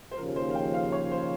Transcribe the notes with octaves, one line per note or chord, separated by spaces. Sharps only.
C5
D#2 C#3 F3 A#4
C5
F5
G5
F5
C#5
C5